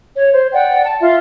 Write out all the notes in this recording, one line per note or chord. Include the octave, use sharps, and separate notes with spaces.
C#5
C5
D5 F#5 G5
A5
F4 E5